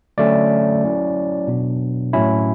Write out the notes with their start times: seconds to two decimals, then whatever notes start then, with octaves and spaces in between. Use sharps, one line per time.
0.18 D3 F#3 A3 C#4 D5
0.83 F#3 C#4 E4
1.48 B2 F#3 B3 D4
2.13 A2 F#3 C#4 E4